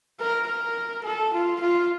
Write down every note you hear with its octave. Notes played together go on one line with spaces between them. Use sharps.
A#4
A#4
A4
F4
F4